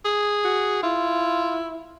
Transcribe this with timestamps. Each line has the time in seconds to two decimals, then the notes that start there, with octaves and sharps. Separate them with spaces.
0.05 G#4
0.44 F#4
0.83 E4 F4